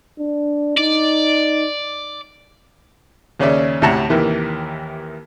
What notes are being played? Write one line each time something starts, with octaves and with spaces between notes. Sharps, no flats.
D4
D#4 D5
D#2 C#3 C#4 D5 E5
D2 A2 C3 F#5 A5 A#5
D#2 C3 D#3 E3